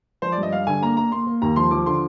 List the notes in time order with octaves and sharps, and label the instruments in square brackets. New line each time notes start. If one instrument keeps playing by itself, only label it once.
[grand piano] F3 [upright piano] C5
[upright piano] D5
[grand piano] G2
[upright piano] D#5
[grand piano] G2 [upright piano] F5
[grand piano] D3 [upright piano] G#5
[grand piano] A#3 [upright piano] A#5
[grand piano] A#3 [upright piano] A#5
[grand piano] A#3 [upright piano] C6
[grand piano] A#3
[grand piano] D#2 [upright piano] A#5
[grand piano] F3 [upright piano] C6
[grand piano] F3 [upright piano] D6
[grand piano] D3 [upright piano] C6